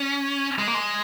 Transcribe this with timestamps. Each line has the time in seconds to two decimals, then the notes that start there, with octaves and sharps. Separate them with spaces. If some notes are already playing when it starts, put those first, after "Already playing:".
Already playing: C#4
0.58 G#3
0.67 A#3
0.74 G#3